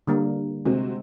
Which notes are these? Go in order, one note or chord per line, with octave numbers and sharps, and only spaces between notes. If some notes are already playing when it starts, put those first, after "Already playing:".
D3 G3 A#3
C3 G#3 C4 F#4